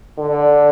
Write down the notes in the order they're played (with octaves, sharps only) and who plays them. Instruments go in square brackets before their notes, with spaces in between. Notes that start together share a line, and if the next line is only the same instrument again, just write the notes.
[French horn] D3